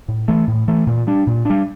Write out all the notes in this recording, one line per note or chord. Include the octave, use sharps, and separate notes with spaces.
A2
E3 A3
A2
E3 A3
A#2
G3 D4
A#2
G3 D4